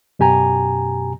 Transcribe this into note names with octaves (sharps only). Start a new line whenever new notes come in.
F#2 B2 G4 G#5 A#5